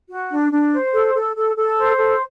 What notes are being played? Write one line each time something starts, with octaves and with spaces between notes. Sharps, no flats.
F#4
D4
D4
C5
A4
A4
A4
A4
C5
A4